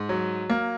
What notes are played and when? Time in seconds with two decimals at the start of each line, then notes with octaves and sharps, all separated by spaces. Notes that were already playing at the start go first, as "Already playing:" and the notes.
Already playing: G#2
0.09 F#3
0.50 A#3